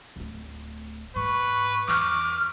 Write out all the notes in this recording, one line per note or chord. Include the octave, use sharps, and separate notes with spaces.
D1 A3
G#2 B4 C#6
E2 D6 F6